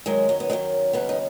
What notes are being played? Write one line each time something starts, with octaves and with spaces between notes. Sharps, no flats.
F#2 D#3 F#3 G#3
F#3
B3
F#2 D#3 F#3 G#3
D#2 C#3 F#3 B3
D#4